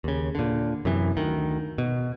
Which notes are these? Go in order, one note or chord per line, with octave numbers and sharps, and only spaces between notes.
D#2 C#3
A#2 D3
F#2 C3 E3
D2 D#3
B2